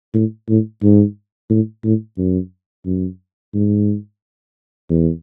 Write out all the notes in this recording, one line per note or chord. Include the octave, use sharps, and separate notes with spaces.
A2
A2
G#2
A2
A2
F#2
F#2
G#2
E2